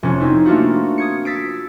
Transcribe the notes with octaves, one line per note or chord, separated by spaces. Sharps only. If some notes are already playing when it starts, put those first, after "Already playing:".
F1 C#4
C4 D#4 E4
A3 A#3 D4 F4 F#4
D#6 G#6 C#7
E6 A6 B6 C7 D7